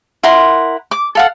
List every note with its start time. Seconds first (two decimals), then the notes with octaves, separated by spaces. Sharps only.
0.23 E4 A#4 F#5 C6
0.91 D6
1.15 A4 F5 F#5